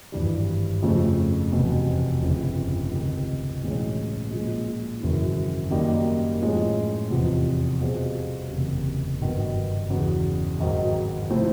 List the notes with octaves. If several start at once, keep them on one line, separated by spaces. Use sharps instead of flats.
G#1 G2 E3 G3
F2 C#3 F3 A3
F1 E2 B2
G1 F2 C#3
C#2 C3 D#3
B1 A2 E3 G#3 C#4
A#2 F3 G#3
G#1 F#2 C#3 E3
F#2 D#3 G3 A#3 D#4
A2 F3 G#3 C#4
F1 E2 C3 F3
B2 G3 C4 F4 G#4
F#1 E2 C3
G#1 G2 D#3 F#3 B3
E2 C#3 F#3
G#1 G#2 D#3 F#3
C3 F3 A3 C4 E4